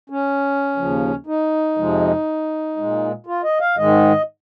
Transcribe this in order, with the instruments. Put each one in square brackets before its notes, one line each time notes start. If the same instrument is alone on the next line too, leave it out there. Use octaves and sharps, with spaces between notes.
[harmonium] C#4
D#2 C#3 F3
D#4
F2 C3 F3 G#3
A#2 G#3
F4
D#5
F5
G#2 D#3 G#3 D#5